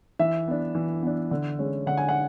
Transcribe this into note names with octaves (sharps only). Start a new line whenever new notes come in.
E3 E5
B3 D4
E3
B3 D4
D3
G#3 C#4
D3 F#5
G#5
F#5